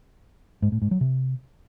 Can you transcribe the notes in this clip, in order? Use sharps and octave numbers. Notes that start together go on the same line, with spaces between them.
G#2
A2
G#2
F#3
C3